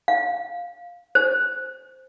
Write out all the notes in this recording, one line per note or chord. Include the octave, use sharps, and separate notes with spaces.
F5
C5